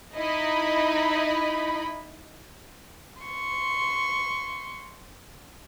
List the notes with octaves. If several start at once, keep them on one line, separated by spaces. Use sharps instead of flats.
D#4 E4 D#5 B5
C6 C#6